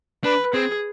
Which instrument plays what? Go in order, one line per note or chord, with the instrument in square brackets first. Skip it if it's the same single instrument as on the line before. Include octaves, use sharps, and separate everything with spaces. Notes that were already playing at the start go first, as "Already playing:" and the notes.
[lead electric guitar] D4 [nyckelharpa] B4
[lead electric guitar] C4 [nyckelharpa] G#4